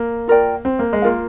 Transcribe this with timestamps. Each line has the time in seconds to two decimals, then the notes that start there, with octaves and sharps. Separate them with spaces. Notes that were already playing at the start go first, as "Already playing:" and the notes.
Already playing: A#3
0.28 F4 A#4 D5 G5
0.65 C4
0.79 A#3
0.93 G#3
1.02 A#3 F4 A#4 F5